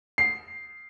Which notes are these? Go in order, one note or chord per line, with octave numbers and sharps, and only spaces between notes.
C7